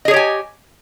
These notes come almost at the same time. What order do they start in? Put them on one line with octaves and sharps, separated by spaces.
D#5 G#4 C#5 G4 G#5